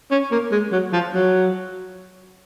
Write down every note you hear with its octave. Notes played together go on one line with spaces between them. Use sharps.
C#4
A#3
G#3
F#3
F3
F#3